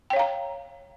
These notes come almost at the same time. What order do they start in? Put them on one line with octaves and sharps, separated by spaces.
G5 C#5 F5 A#5